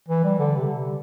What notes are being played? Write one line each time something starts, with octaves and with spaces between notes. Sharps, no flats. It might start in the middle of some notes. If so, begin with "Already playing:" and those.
E3
G3
D3
C3